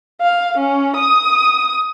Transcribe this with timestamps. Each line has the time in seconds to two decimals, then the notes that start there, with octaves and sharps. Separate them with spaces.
0.21 F5
0.57 C#4
0.96 D#6